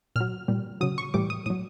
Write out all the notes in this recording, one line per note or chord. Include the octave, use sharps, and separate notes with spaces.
A#2 F#3 F6
A#2 G3
C#3 F#3 D#6
C#6
A2 E3 G3 D6
D#6
A2 F#3 D#6